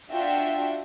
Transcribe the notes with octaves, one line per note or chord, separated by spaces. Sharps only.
D4 F4 F#4 E5 G5